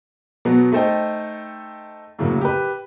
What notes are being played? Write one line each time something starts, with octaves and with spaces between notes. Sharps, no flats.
B2 F#3 B3
A3 D#4 A4 C5 D#5 G5
F#2 A2 C#3 F#3 A#3
G4 B4